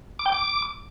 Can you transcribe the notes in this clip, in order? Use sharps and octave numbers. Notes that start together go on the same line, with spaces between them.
D6
G5
D6